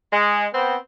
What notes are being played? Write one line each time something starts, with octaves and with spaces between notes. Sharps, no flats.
G#3
B3 C4